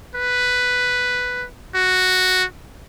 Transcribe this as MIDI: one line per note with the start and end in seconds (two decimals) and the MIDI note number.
0.15 1.46 71
1.75 2.44 66